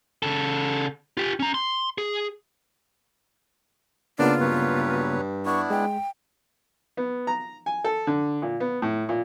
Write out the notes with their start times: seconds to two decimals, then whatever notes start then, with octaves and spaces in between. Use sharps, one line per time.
0.23 C#3 A4
1.17 F4 G4
1.40 C#4 A#5
1.54 C6
1.98 G#4
4.19 C#3 A#3 B3 D4 F4
4.40 G2 F#3 B4 C#5
5.46 B3 D4 E4 C#6
5.70 G#3 G5
6.97 B3
7.27 A#5
7.66 G#5
7.84 A4
8.07 D3
8.42 A#2
8.60 B3
8.82 A2
9.09 A#2